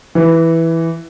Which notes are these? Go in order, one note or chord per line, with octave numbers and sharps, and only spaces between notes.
E3